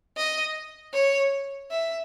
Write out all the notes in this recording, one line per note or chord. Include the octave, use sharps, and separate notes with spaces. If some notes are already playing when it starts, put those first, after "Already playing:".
D#5
C#5
E5